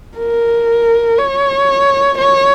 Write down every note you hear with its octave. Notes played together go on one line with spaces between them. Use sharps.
A#4
C#5
C#5